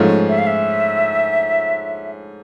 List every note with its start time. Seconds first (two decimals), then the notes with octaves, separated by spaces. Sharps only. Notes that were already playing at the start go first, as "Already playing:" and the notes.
Already playing: G#2 F3 A3 C#4 F4
0.29 E5
0.38 F5
0.47 E5